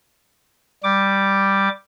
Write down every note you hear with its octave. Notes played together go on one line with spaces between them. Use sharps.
G3 D6